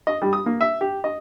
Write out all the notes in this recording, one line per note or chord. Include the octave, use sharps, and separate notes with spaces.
D#5
G3
D#6
A#3
E5
G4
D#5